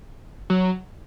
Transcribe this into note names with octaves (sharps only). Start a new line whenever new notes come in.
F#3